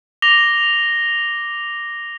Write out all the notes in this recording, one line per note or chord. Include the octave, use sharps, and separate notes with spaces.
D6 A#6 F7 G7